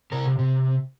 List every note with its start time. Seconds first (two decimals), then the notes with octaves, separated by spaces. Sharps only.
0.12 C3 A#4
0.39 C3